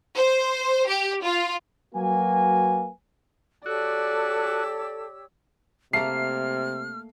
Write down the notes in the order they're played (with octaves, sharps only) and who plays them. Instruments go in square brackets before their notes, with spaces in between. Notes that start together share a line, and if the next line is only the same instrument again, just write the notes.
[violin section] C5
G4
F4
[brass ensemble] F#3 A#3 F#4 B4 G#5
[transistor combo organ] F#4 [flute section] G4 C#5 E6 [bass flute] A4 [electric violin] D5
[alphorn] C3 [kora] A3 A#3 [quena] F6 [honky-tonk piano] C7